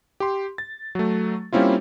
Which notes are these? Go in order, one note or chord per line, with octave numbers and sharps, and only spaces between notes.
G4 C6
A6
F#3 A3
G3 A#3 C4 C#4 E4 F4